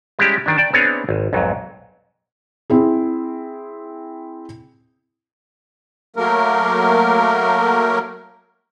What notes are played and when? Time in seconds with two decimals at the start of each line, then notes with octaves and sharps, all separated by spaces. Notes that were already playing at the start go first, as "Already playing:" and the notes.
0.19 G3 G#3 C#4 E4 G4
0.46 D#3 D4
0.58 D5 G5 A5
0.73 B3 C4 D4 E4 G#4 C#5
1.09 G#1
1.33 B1 F2 G#2 F#3
2.70 C4 E4 G#4
6.16 F#3 A3 A#3 A#4